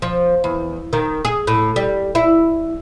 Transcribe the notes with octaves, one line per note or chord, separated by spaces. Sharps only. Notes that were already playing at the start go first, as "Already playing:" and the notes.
F3
E2
D#3
G#4
A2
G3
E4